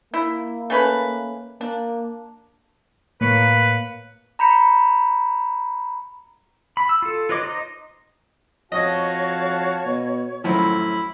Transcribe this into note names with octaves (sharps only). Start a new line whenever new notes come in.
A#3 E4
A3 C#4 B4
A#3 D4
A2 A#3 B4 C#5 C#7
A#5 B5 G6 C#7
B5
E6
F4 A4
F4 B4 C#5 D#5 D6
D#4 C5 D#5
F2 F#4 C#5 D#5 F5 A5 D#6
B2
F#2 A2 D#3 F3 E4 B5